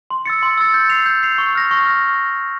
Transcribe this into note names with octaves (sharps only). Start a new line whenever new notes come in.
C6
E6 A6 C#7
C6
E6 A6 C#7
G6
C7 F7
G6
C7 F7
C#6
F6 A#6
C#6
F6 A#6